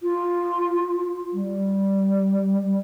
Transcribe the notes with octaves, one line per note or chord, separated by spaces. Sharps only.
F4
G3